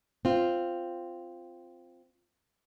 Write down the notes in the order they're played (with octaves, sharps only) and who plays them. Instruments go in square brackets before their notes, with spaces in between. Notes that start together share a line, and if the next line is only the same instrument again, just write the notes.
[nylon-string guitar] C4 F4